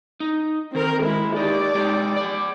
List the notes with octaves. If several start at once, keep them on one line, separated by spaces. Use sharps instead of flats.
D#4
D#3 C4 A#4
G#3 E4
D#4 G4 D5
G#3 D#4 G4
G#4 D5